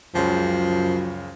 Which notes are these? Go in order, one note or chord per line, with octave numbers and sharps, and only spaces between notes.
C#2 F#2 C#3 F3